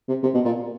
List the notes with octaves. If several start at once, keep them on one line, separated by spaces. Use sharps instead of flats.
C3
C3
B2
A#2